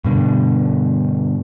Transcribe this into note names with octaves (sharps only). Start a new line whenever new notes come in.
G2 B2 D3